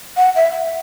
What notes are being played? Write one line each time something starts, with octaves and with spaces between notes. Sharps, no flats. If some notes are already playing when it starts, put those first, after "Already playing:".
F#5
E5